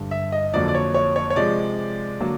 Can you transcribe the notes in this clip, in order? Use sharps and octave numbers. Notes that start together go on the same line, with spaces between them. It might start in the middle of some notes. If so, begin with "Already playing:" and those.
Already playing: G2 D3 G3
E5
D#5
F2 D3 F#3 A#3 D5
D5
C#5
C#5
C#5
C#5
C3 F3 G#3 D5
D3 F#3 A#3